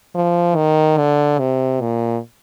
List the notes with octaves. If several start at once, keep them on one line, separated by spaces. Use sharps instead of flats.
F3
D#3
D3
C3
A#2